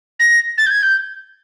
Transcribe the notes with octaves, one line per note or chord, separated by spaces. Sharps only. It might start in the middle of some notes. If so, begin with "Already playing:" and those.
A#6
A6
G6
G#6
G6